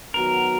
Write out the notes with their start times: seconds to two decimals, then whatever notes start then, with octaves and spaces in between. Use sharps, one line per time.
0.14 D#3 F#3 B3 F#4 A#4